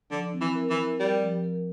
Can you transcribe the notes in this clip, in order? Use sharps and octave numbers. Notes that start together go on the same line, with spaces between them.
D3 F3
C4
E3
A#4
E3
A#4
G3 A#4
F3
A#4